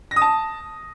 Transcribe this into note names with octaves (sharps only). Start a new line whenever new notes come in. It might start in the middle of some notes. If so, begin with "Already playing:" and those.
A#6
D#6
A5